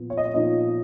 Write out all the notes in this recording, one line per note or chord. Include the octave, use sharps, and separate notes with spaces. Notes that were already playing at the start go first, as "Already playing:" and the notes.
Already playing: A#2 F3 B3
C#5
D#5
C#5
A#2 F3 B3 D#4 D#5